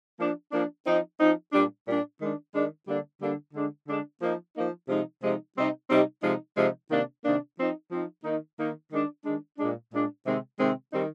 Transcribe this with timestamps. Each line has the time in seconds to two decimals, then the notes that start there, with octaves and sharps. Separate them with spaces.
0.19 F3 A#3 D4
0.52 F3 A#3 D4
0.86 F3 C4 D#4
1.19 F3 C4 D#4
1.52 A#2 G3 D4
1.86 A#2 G3 D4
2.20 D#3 G#3 D4
2.54 D#3 G#3 D4
2.87 D3 G3 A#3 D4
3.21 D3 G3 A#3 D4
3.54 D3 G#3 D4
3.87 D3 G#3 D4
4.21 F3 A#3 D#4
4.54 F3 A#3 D#4
4.88 C3 F3 G#3 D#4
5.22 C3 F3 G#3 D#4
5.56 C3 G3 C4 D#4
5.90 C3 G3 C4 D#4
6.23 C3 F3 G#3 D#4
6.56 C3 F3 G#3 D#4
6.90 C3 D#3 A#3 D4
7.24 C3 D#3 A#3 D4
7.57 F3 C4 D#4
7.91 F3 C4 D#4
8.24 D#3 A#3 D#4
8.58 D#3 A#3 D#4
8.91 D#3 G#3 D4
9.25 D#3 G#3 D4
9.58 A#2 G#3 D4
9.92 A#2 G#3 D4
10.25 C3 D#3 G#3 C4
10.60 C3 D#3 G#3 C4
10.93 D#3 G3 C4 D#4